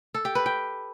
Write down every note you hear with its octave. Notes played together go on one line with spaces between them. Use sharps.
A4
G4
B4
G5